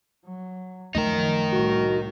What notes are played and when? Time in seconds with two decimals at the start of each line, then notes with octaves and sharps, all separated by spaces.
0.24 F#3
0.95 F#2 D#3 F3 A3 D#4 A#4
1.52 C2 A2 F#4